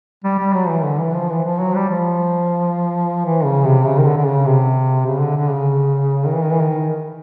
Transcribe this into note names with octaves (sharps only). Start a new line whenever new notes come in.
G3
G3
F#3
E3
D3
E3
F3
E3
F3
F#3
G3
F3
E3
C#3
C3
C#3
D#3
D3
D3
C#3
C3
C#3
D3
D3
C#3
D#3
E3
D#3
E3
D#3